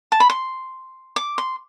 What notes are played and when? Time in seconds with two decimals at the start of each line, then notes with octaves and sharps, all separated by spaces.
0.12 A5
0.20 B5
0.30 C6
1.16 D6
1.38 C6